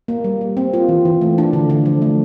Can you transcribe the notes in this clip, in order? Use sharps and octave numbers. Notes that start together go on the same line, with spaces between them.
A#3
G3
G3
C4
F4
E3
E3
A3
D4
D3
D3
F3
A3